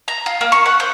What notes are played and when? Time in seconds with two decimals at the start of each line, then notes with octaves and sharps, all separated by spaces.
0.08 A#5
0.26 F4
0.41 A#3
0.52 C#6
0.66 F#5
0.80 C5